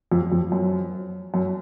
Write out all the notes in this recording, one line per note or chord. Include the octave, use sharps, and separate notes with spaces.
F2
F2
F#2
F#2